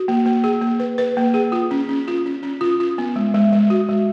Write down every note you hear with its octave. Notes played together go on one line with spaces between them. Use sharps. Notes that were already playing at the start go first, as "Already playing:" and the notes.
Already playing: F#4
A#3
A#3
G#4
A#3
B4
B4
A#3
G#4
F4
C#4
C#4
F4
C#4
C#4
F4
F4
B3
G#3
G#3
G#3
F#4
G#3